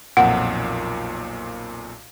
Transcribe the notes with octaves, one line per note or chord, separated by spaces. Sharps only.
B1 F2 A#2 F#5